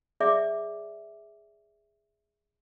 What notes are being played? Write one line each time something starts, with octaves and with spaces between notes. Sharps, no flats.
G#4 D5 E5 D6